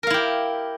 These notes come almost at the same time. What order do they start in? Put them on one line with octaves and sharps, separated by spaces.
A#4 F5 E4 G4